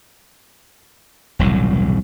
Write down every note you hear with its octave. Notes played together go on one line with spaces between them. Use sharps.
E1 C2 A2 F#3